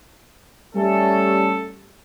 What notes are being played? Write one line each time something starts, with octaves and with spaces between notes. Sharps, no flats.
G3 A3 C#4 A4